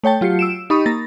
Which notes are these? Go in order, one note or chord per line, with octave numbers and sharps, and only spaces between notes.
A3 C#5 G5 A5
F#3 F4 G4 C7 C#7
E6 D7 E7
D#4 G4 B5 C#6 D#6
A#3 A6 A#6